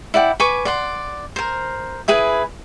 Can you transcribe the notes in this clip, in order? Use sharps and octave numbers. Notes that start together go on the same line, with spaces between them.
E4 D5 F#5 G5
B4 G#5 C#6 D6
D5 F#5 C6
A#4 C5
E4 G#4 B4 G#5